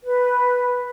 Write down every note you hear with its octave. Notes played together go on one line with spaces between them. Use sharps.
B4